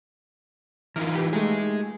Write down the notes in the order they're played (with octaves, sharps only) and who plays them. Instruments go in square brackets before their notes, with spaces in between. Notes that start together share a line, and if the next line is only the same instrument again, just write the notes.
[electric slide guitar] E3 D#4 F4 [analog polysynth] A#4
[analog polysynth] G4 B4
[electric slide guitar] G#3 G#4 [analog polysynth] A3 D#4 G4